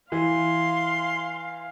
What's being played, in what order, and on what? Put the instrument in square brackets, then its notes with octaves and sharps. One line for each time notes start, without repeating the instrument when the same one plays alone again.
[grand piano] E3 [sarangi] F5 [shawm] C6